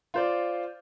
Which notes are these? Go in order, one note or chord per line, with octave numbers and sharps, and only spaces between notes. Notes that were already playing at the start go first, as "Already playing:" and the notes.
F4 C5 D5